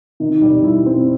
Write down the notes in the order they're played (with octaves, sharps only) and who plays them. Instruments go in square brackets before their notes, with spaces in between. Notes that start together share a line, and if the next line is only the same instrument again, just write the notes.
[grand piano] D#3
G3
E4
C4